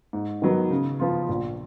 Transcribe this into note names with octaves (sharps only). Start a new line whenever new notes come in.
G#2
D#3 F#3 B3
C#3
F3 B3 F4
A#1